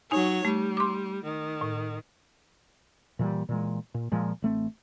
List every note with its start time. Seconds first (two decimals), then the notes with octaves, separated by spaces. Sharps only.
0.11 F#3 D#4 C#5 G#5
0.45 G3 A3
0.77 C6 D6
1.24 D#3
1.61 A2
3.19 A#2 E3 F3 G3
3.49 A#2 E3 G#3
3.94 A#2
4.12 A#2 F3 G#3
4.42 A1 A3 C4